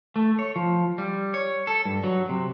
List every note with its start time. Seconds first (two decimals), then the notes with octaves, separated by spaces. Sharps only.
0.16 A3
0.39 C#5
0.56 F3
0.98 G3
1.34 C#5
1.67 A4
1.85 G2
2.04 F#3
2.29 C3